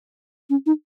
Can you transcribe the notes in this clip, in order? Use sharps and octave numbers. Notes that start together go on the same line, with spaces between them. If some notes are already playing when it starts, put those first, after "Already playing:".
C#4
D#4